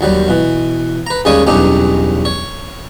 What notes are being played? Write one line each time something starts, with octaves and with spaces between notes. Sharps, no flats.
D#2 F#3 G3
B2 E3
B4 A#5
D#2 C#3 G3 G#3 C#5 D#6
B1 E2 G2 C#4 D#4 G4
C#5